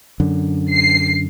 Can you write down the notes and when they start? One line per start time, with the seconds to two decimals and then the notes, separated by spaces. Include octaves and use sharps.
0.20 F#2 D3
0.73 C7